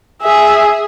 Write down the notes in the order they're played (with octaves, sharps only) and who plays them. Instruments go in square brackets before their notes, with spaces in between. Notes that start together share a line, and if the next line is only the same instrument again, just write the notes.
[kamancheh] G#4 E5